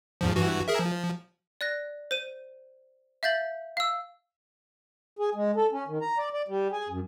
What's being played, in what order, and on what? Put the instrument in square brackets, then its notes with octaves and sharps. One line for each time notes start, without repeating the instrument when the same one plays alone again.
[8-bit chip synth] E2 G#2 F3
G2 E3 F#4
G#4 A#4 E5
F3
[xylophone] D5 F#6 A#6
C5 D#7
E5 F5 G6 A6 F#7
F5 E6
[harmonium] G#4
G#3
A4
C#4
D#3
A#5
D5
D5
G3
G#4
F#2